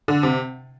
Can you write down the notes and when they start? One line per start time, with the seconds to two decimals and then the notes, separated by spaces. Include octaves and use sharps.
0.08 D3
0.23 C3